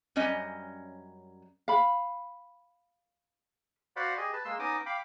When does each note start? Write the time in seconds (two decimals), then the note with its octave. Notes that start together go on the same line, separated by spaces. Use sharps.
0.16 F#2 G3 C#4 D#5
1.68 F5 B5
3.96 F#4 C5 D5 F5 F#5 B5
4.17 G4 G#4 D#5
4.33 B4 A5
4.45 G#3 A#3 C6 E6
4.59 B3 C#4 D#4 D#5 D6 D#6
4.86 F5 G5 B5 D6